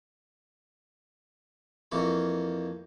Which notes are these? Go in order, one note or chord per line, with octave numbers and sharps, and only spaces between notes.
F2 E3 A#3 C#5 B5